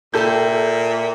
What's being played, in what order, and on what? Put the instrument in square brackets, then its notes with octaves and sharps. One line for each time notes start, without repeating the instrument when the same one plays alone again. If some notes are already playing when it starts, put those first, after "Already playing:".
[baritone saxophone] A#2 [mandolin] E4 G4 [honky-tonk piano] A4 G6